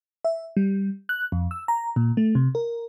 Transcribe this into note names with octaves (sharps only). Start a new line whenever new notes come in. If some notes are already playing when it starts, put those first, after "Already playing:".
E5
G3
F#6
F2
E6
A#5
A#2
A3
C3
A#4